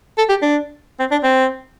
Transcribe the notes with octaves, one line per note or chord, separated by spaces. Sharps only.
A4
G4
D4
C4
D4
C4